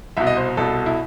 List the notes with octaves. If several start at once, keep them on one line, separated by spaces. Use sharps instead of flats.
C2 B2 E5
D#5
C5
C2 B2 A4
E4